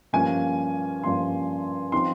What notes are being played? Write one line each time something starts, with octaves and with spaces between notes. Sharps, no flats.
G2 F3 A#3 C#4 G#5
G2 F3 A#3 C#4 C6
F3 C4 D#4 C6